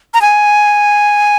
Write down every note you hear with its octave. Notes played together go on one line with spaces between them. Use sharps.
A#5
G#5